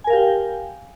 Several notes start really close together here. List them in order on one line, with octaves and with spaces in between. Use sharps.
G#5 A#4 F5 G4 G5